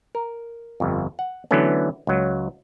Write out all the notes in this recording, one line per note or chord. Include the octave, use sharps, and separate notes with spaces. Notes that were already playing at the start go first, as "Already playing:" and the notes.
A#4
G1 F2
F#5
D3 E3 F#3 A3 B3 C#4
C#2 F#3